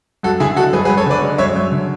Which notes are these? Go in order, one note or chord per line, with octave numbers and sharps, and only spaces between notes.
F#2 F#4 A4
D3 E4 G#4
G#3 F#4 A4
F#2 G#4 B4
G#4 B4
F#2
A4 C#5
D3 B4 D5
G#3
F#2 C#5 E5
F#2
D3